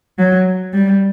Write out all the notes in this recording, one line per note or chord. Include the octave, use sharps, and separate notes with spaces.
F#3
G3